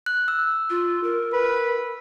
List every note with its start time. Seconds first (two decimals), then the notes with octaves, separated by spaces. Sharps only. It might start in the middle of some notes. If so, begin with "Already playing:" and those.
0.06 F#6
0.28 E6
0.70 F4
1.04 A#4
1.32 B4